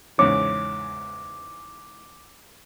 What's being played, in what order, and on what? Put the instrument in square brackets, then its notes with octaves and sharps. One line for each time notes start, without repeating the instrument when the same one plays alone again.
[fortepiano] E2 G#2 C#3 [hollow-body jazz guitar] C#5 [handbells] D6